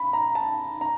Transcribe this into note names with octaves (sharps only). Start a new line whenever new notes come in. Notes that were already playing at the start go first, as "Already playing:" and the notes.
Already playing: B5
A#5
A5
A#5